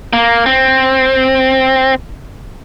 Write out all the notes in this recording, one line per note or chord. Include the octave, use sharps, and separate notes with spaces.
A#3
C4